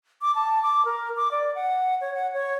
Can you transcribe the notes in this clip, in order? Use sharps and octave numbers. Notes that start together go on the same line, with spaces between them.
D6
A5
D6
A#4
D6
D5
F#5
C#5
F#5
C#5